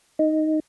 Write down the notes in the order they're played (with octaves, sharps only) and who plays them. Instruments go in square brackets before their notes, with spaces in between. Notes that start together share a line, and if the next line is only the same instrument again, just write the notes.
[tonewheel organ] D#4